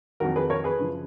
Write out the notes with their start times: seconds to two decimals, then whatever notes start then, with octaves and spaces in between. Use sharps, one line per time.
0.20 F2 D#3 F#3 F#4 A#4
0.36 G#4 B4
0.50 A#4 C#5
0.64 G#4 B4
0.79 F#2 C#3 F3